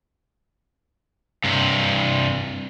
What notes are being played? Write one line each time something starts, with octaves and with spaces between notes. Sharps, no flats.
G2 C3